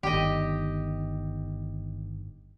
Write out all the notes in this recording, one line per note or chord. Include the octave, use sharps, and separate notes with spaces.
G1 D#3 G4 D#5